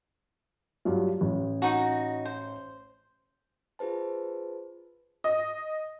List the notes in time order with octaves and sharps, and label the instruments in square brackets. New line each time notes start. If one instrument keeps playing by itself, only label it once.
[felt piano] G2 F#3 F4
A1
[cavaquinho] D#4 F#4
C5
[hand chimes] F4 G#4 B4 C5 A5
[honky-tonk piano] D#5